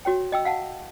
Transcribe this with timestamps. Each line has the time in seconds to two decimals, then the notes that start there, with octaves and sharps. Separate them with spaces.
0.05 F#4 C#5 G5
0.32 D#5 G5 E6
0.45 F5 F#5 A5